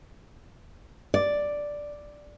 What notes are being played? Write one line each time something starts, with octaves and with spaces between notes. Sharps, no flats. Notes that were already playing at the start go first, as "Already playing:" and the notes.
D5